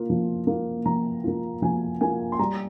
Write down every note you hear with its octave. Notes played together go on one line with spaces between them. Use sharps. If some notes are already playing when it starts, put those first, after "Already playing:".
Already playing: A#3 F4
F3
A#3 F4
F3 A#5
A#3 F4
F3 G#5
A#3 F4 G#5
C6
G3 A#5